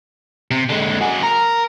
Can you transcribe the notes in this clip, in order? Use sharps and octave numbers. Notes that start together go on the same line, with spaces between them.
C3
D3 G#3
F#4 G#4
A#4